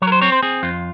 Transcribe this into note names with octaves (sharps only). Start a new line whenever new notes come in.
F#3 C#5
A#4
C5
C4 C#5
C5
C4 G#4
F2 F4